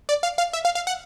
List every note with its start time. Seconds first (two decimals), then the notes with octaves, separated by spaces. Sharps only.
0.09 D5
0.23 F5
0.38 F5
0.53 E5
0.65 F5
0.75 F5
0.87 F#5